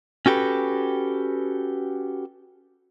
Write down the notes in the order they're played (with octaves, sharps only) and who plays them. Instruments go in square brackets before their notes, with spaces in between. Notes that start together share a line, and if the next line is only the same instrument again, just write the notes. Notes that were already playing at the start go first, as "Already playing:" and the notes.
[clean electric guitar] C#4 F#4 G4 A4 B4